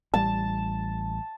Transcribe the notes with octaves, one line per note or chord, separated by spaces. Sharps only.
A1 G3 A5